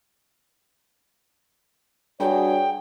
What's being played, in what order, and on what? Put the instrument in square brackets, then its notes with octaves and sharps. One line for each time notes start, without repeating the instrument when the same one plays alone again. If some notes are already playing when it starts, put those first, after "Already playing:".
[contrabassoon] G2 [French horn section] F#4 G#4 C#5 [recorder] G5